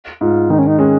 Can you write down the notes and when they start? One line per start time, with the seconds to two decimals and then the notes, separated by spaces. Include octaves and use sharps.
0.21 G#2 F4
0.50 D#3 D#4
0.59 C#4
0.67 D#4
0.79 G#3 C#4